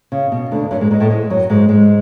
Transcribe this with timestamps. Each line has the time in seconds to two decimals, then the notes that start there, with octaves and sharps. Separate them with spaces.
0.12 C#3
0.32 B2
0.51 D2 D3
0.71 F#2 F#3
0.81 G#2 G#3
0.91 G#2 G#3
1.00 A2 A3
1.10 G#2 G#3
1.30 F#2 F#3
1.50 G#2 G#3
1.69 G#2 G#3